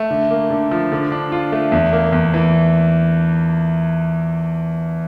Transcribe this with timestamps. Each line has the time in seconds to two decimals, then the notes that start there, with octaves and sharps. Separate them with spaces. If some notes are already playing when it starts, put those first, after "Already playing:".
Already playing: A3
0.10 D3
0.30 A#3
0.51 D3
0.71 F3
0.92 D3
1.12 D4
1.32 F4
1.52 A3
1.72 E2
1.93 A#3
2.13 E2
2.34 E3